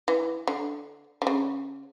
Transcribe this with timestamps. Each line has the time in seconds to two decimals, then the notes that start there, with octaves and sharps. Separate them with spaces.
0.08 E3
0.47 D3
1.22 D3
1.27 C#3